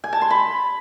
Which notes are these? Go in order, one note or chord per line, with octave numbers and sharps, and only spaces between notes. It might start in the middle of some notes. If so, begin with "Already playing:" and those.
G#5
A5
C6
B5